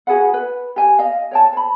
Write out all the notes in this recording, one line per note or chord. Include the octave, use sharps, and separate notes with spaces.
F#4 G#4 B4 F#5
B4
G4 G#5
D#5 F5
C#5 G5 A5
C5 B5